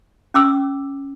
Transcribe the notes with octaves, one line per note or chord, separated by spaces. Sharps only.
C#4 D6 E6